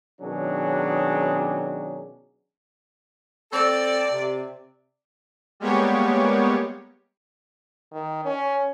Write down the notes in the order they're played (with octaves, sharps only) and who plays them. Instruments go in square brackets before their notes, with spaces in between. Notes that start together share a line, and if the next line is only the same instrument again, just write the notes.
[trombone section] B2 D#3 F#3 C#4 D4 G#4
[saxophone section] C4 A4 [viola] D5
[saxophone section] C3
[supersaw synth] G3 G#3 A#3 B3 G4 C#5
[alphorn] D#3
C#4